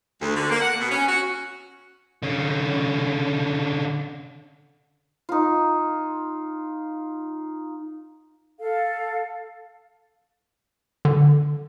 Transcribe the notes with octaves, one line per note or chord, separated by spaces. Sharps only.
D2
D3
A#3
F#5
B2
C#4
F#4
D3 C#4
D#4 F4
A4 F5
D3